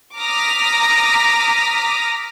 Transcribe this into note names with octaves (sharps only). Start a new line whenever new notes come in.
A#5 D6 D#6 F6 A#6 B6